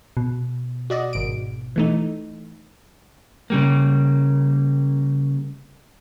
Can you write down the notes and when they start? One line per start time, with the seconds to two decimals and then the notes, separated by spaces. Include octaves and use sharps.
0.17 B2
0.90 F#4 D5 D#5
1.13 G#1 D7
1.76 E3 A3 D#4
3.50 C#3 G3 A#3